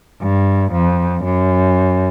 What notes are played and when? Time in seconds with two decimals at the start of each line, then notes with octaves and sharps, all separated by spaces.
0.22 G2
0.73 F2
1.24 F#2